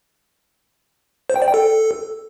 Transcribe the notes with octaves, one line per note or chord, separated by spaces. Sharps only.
C5
G5
D5
G5
A4